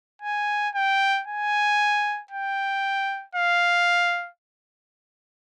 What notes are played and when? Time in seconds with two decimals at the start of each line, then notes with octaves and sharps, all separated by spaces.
0.22 G#5
0.75 G5
1.28 G#5
2.31 G5
3.35 F5